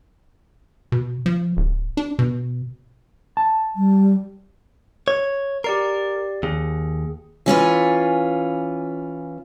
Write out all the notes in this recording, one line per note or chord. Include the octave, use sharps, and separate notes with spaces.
B2
F3
D1
D4
B2
A5
G3
C#5
G4 A#4 D5 C7
D#2 G#4
E3 C#4 F4 B4